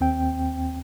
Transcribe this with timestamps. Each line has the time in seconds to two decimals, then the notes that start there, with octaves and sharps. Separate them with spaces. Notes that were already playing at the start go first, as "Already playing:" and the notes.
0.01 D#2 C4 G5